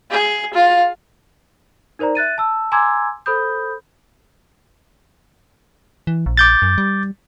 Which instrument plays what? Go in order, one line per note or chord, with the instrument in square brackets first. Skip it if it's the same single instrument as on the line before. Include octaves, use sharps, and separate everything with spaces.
[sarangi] G#4
F4
[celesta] D#4 A#4 C5 D5 A#5
E5 F#6 A6 D#7
A5 E6
G#5 A#5 C6 D6 E6 G#6
A4 C5 B5 D#6 G6
[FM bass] E3
A#1
[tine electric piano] D6 G6 A6
[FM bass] F#2
G3